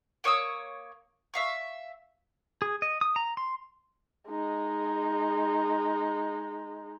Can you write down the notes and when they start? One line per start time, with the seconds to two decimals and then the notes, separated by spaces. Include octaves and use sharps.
0.24 A#3 C#5 D#6 E6
1.34 E5 F5 C#6
2.62 G#4
2.82 D#5
3.01 D#6
3.16 A#5
3.37 C6
4.29 G#3 D#4